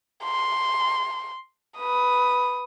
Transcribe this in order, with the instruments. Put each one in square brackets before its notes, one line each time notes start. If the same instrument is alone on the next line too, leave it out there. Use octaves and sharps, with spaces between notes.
[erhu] C6
[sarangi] B4 [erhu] D#6